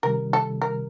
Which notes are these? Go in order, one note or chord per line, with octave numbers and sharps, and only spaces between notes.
C3 D#3 G3 A#4
A4
A#4